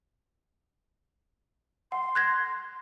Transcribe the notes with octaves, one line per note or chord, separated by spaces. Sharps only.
F#5 C6
F#6 G#6 A#6